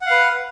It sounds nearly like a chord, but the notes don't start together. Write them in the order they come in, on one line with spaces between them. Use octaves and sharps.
F#5 F5 B4